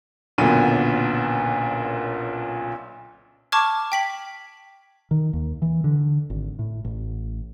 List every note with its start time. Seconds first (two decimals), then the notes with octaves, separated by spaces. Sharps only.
0.38 F#1 B1 A#2 D3 B3 D#7
3.52 A5 C#6 D6 F6 G#6
3.92 G5 B6 F#7
5.11 D#3
5.33 D#2
5.62 E3
5.84 D3
6.30 G#1
6.59 A2
6.85 A1